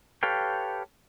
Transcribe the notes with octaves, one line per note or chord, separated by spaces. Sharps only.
G4 A4 B4 C#5 F5 G5